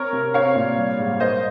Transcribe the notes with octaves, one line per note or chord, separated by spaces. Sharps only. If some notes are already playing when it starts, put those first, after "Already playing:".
Already playing: C4 A#4 C#5
C3
C4 C#5 F5
A#2
G3
G#2
A#3 C5 D#5